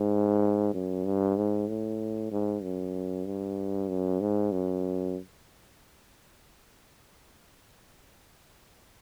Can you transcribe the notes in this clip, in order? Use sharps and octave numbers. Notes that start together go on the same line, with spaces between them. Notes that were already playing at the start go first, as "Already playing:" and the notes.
Already playing: G#2
F#2
G2
G#2
A2
G#2
F#2
G2
F#2
G#2
F#2